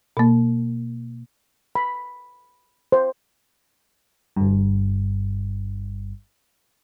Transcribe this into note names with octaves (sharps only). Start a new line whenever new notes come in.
B2 A#3
B5
C5
G1 G2